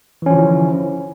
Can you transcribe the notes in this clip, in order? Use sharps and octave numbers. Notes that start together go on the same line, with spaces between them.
D3 E3 F3 C#4 E4